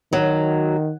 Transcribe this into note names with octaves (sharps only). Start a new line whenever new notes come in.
D#3 F#3